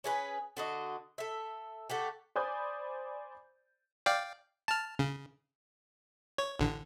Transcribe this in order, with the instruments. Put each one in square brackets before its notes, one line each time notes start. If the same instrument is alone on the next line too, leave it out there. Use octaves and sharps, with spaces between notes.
[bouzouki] C#4 G#4 B4
D3 F#4 D#5
A4 E5
A3 F#4 G4
[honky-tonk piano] C5 D5 G#5 B5 D#6 G6
[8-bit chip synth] D5 F5 G5
A5 F6
C#3
C#5
A1 D3